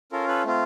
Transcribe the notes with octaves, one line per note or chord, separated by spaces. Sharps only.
C#4 F4 A4 A#4
A4 B4
A3 C4 F4